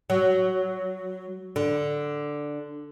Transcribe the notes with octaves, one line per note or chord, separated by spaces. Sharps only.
F#3
D3